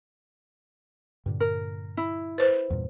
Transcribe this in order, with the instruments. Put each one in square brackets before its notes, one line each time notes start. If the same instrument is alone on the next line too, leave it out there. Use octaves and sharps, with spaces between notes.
[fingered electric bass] G2 A#2 D3
[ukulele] A#4
E4
[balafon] B4 C5
[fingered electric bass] E2 G2 A#2